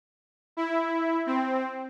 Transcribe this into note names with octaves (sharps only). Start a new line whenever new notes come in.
E4
C4